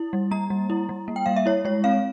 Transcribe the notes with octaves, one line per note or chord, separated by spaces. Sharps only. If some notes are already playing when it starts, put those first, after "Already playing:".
Already playing: E4
G3
A#3 A#5
G3
E4
G3
A#3
G5
G3 F5
E5
E4 C#5
G#3 C#5
C4 F5